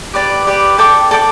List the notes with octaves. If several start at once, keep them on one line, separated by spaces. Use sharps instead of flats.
G4 B4 D5
G4 B4 D5
A4 D5 G5 D6
A4 D5 G5 D6